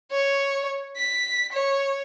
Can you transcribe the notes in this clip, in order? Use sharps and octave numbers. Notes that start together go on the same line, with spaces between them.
C#5
B6
C#5